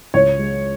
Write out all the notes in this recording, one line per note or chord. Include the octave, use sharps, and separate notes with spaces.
C#2 C#5
G#3